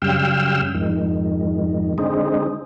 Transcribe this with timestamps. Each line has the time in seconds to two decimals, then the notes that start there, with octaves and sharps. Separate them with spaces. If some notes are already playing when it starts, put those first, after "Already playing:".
0.02 F#2 C#3 G3 F5 G5 E6
0.75 F2 G#2 D#3
1.98 D3 G#3 C4 D#4